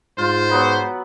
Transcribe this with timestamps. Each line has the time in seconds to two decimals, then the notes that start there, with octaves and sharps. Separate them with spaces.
0.18 G#2 F4 C5
0.50 F#3 B3 B5